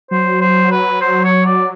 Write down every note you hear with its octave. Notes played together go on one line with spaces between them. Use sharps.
F#3 C5
C5
B4
C5
C#5
D5